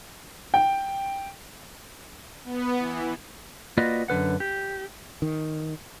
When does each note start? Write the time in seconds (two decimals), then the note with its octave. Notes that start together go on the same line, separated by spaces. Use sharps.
0.54 G5
2.44 B3
2.78 E3
3.77 A#3 F4 F#4 B4 D5 D#5
4.08 F#2 D3 B4 F#5
4.40 G4
5.22 D#3